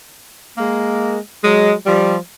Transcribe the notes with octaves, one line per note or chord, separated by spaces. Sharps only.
G#3 A#3
F#3 G#3
F3 G3